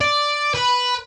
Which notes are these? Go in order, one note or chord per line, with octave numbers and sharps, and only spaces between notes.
D5
B4